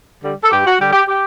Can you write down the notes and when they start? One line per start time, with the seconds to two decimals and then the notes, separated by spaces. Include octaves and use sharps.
0.22 D3 G3
0.43 A4
0.51 G2 G4
0.65 F#4
0.79 D3 G3 G4
0.93 G4
1.08 G4